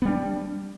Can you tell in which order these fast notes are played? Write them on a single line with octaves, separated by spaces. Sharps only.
B3 G3 D4